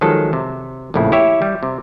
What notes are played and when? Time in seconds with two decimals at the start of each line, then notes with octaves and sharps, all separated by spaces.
0.01 D#3 F3 F#3 G#3 A4 A5
0.33 C3
0.94 A#1 F2 A2 C#3 E4
1.12 E4 G4 C#5 E5
1.42 G3
1.63 C3